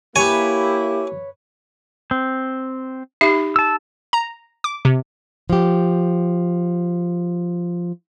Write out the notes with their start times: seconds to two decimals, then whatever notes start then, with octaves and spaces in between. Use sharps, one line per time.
0.16 A#3 E4 G4 B4 C#5 G#5
2.11 C4
3.21 D#4 G4 E5
3.56 A5 E6
4.13 A#5
4.64 D6
4.85 C3
5.50 F3 G4